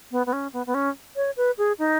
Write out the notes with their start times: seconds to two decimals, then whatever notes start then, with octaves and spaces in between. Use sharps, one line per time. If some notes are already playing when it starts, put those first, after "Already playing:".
0.11 B3
0.27 B3
0.33 C#4
0.53 B3
0.67 B3
0.74 C#4
1.16 C#5
1.37 B4
1.58 G#4
1.79 D#4